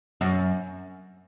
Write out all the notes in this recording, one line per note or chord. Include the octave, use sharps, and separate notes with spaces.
F#2